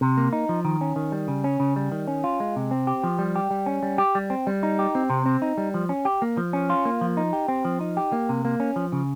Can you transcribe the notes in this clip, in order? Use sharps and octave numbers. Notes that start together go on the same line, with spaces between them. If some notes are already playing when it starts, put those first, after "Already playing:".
C3
A#3
D#4
F3
D#3
C#4
D#3
G3
C#3
C#4
C#3
G3
D#3
C#4
F4
G#3
C3
C4
G4
F3
G3
G4
G3
C#4
G3
G4
G3
C4
G3
D#4
G4
C4
C3
C4
D#4
G3
F3
C#4
G4
A#3
F3
C#4
F4
A#3
F3
D#4
G4
C4
F3
D#4
G4
A#3
C3
A#3
C#4
F3
C#3